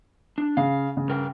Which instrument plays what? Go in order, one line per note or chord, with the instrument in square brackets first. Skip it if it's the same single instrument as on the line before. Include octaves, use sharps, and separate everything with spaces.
[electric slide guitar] D4
[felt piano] C#3 [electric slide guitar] F5
[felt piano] C#3
[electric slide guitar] G2 A#4 G5